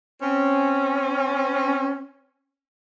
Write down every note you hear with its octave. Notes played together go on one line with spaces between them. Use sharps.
C4 C#4